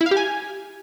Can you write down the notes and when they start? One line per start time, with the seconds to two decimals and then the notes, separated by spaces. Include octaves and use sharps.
0.01 E4
0.06 F5
0.11 G4
0.17 G#5